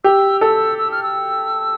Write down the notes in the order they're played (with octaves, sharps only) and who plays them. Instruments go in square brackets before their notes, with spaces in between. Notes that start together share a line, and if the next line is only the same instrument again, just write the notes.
[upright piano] G4 [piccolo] E6
[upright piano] A4 [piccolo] E6
[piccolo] E6
F6
E6